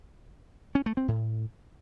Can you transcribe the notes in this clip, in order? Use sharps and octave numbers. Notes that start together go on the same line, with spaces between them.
C#4
A3
C4
A2